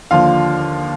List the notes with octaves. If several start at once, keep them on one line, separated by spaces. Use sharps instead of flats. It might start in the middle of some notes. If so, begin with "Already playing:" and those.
D#2 D3 F3 F4 F5